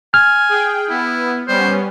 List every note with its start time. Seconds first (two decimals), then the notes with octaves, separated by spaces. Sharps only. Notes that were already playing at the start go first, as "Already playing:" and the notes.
0.14 G#5 F6
0.49 G#4 G5
0.90 B3 E4
1.48 G3 B3 C#4 C5